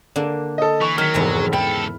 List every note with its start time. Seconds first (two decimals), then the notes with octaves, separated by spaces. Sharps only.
0.16 D3 A#3 D4
0.58 A4 D#5
0.82 E3 C#6
0.98 D#3 F#3 F6 B6
1.14 F1 E2 G#2 E5
1.53 C#2 E4 A4 G5